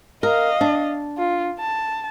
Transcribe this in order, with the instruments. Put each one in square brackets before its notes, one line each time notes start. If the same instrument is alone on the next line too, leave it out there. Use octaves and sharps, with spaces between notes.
[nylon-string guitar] A#4 [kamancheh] D#5 F5
[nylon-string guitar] D4
[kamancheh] F4
A5